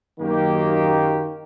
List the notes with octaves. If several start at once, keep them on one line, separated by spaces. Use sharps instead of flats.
F#2 D#3 A#3 G4